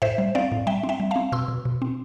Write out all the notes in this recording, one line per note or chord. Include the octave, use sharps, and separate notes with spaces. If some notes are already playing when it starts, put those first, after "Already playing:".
A2 C5 E5
G3
C4 D5 F5
A2
G3 E5 G5
C4
E5 G5
G3
C4 F5 A5
B2 C6 E6
B2
B2
C4